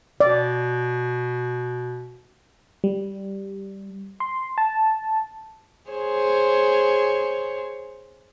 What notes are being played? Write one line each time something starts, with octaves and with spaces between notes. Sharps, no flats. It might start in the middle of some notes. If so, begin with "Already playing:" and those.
B2 D5
G3
C6
A5
G#4 C5 C#5